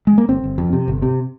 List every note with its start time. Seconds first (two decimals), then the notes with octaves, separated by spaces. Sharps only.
0.07 G#3
0.18 A#3
0.28 G1 C4
0.44 G1
0.58 F2
0.73 C3
0.88 G1
1.02 C3